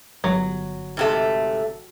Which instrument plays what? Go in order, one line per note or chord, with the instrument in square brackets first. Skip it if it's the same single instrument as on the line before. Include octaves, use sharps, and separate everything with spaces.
[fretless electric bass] G1 [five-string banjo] F#3
[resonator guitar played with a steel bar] G#2 C3 A3